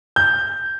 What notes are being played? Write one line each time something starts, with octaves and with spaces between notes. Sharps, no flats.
G6